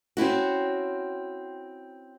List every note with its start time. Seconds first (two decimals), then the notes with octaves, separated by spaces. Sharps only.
0.17 C4 C#4 E4 F#4